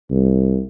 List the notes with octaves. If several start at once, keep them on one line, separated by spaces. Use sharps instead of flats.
C2